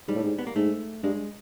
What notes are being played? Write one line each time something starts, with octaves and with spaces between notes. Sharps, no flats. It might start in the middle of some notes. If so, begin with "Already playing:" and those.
G#2 G3
A2
G#2
B3
A#3
G#2 A3
G2 G#3